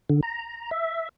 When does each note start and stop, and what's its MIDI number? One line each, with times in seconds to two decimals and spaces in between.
0.10 0.20 50
0.23 0.70 82
0.71 1.09 76